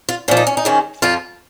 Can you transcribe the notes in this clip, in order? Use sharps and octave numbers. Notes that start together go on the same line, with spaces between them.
F4
A#2 F3 C#4
D#4
C#4
D#4
G#2 D#3 C#4
F2 F3 F4